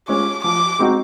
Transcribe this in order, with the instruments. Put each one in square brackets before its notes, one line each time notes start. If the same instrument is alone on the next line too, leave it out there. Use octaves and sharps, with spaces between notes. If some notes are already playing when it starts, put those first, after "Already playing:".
[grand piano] G#3 C#4 F4 [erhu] D6
[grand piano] F3 [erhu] D6
[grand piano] G#3 C4 D#4 F#4